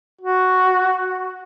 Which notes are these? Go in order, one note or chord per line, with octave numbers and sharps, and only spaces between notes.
F#4